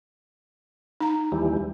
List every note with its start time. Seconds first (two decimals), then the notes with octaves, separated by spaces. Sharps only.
1.00 D#4 A#5
1.32 D#2 E3 G3